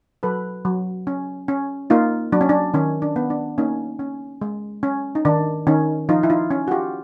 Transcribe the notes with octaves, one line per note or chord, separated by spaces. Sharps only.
F#3 A4 B4
F#3
C#4
C#4
A#3 D#4 F4
F#3 D4
C#4
D4
D#3 C#4
D4
B3
D4
A#3 C#4 D#4
C#4
G#3
C#4
D#4
D#3 D4
D#3 C#4 D#4
F3 D#4 F4
E4
D#4 F4
C#4
F#4
F4 G4